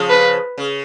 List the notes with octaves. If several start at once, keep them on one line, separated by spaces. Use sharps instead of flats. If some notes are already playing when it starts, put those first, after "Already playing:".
Already playing: C#3 F3
B4
C#3